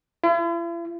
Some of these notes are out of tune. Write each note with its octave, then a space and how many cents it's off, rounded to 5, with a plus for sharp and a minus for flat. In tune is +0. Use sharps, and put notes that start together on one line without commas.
E4 +45